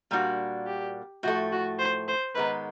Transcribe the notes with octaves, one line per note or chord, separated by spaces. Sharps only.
A#2 G3 A#3 D4 F#4
G4
A2 F3 A3 F#4
F#4
C5
C5
G#2 D#3 G#3 B3 B4